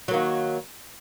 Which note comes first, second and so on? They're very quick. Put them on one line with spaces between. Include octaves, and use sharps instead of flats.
F#3 A#3 D#3